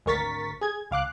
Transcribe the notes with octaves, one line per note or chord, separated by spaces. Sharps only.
G#1 D2 A#4 C#6 A6 B6
G#4 G#6
C#2 F5 D6 F#6